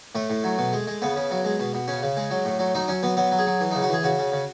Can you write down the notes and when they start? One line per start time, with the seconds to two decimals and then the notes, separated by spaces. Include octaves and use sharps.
0.15 A2 A3
0.30 A2
0.44 F#3
0.58 B2
0.73 G#3
0.87 G#3
1.02 C#3 B3
1.16 C#3
1.31 F#3
1.45 G#3
1.60 B2
1.74 B2
1.88 C#3 C#4
2.02 C#3
2.17 G#3
2.31 F#3
2.45 A2
2.59 F#3
2.75 F#3 D#4
2.88 F#3 C#4
3.03 F#3 B3
3.17 F#3 B3
3.31 F#3
3.39 G#4
3.47 F#3
3.60 E3
3.71 C#3 D#4
3.82 F#4
3.89 E3 G#4
4.03 C#3 F#4
4.19 C#3
4.32 C#3